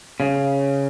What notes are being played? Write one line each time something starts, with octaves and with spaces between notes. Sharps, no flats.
C#3